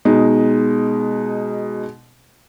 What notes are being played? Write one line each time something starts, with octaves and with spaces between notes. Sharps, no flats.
B2 G#3 D#4